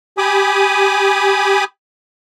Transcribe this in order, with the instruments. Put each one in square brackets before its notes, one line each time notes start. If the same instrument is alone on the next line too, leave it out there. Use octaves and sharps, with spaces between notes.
[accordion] G4 G#5 B5 D6 D#6